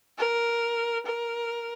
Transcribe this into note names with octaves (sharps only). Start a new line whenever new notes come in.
A#4
A#4